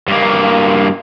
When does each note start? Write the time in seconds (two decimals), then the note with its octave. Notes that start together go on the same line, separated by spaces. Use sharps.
0.08 G2 A#3